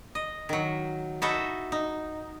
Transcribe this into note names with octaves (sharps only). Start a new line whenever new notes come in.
D#5
D#3 F#3
D#4 E4 F#4 A4 D#5 E5
D#4